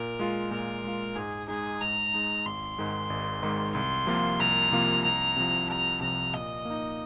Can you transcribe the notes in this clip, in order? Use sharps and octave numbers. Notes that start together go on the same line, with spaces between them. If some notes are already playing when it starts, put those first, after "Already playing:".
Already playing: A#2 A#4
G#3 F4
A#2 A#4
G#3 F4
G#2 G#4
G#3 D#4 G#4
G#2 A#5
G#3 D#4
G#1 C6
G#2 D#3 G#3
G#1
G#2 D#3 G#3
C2 C6
C3 F3 A#3 F4
C2 A#5
C3 F3 A#3 F4
C2 A#5
C3 F3
C2 A#5
C3 F3 A#5
A#2 D#5
A#3
D#4